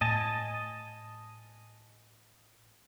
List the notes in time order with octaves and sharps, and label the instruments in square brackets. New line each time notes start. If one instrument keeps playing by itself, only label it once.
[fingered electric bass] A2 [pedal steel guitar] D#5 G#5 A5